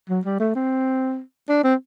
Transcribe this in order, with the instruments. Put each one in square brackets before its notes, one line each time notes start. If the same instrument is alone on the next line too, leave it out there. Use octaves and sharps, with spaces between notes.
[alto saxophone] F#3
G3
A3
C4
D4
C4